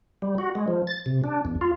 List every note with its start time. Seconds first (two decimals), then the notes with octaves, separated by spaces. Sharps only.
0.22 G3
0.38 F#4
0.55 G#3
0.68 F3
0.87 A6
1.06 C3
1.24 D4
1.45 E2
1.61 F4